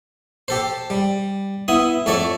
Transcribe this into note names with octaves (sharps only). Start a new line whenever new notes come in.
G4 A4 C5
G3
B3 E4 D#6
F2 A3 A4 C#5 D5